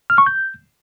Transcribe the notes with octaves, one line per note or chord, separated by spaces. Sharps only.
F6
C#6
G6